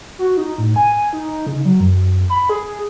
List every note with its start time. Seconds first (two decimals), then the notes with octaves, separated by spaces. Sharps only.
0.19 F#4
0.37 D#4
0.58 A2
0.76 G#5
1.13 D#4
1.47 C#3
1.65 F#3
1.80 F#2
2.30 B5
2.49 G#4